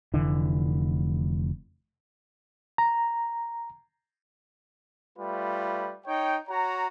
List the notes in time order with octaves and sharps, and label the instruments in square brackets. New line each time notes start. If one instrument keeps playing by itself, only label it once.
[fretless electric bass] F1 D3 E3
[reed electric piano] A#5
[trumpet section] G3 A3 F4 B4
D#4 C#5 G5
F#4 C#5 A#5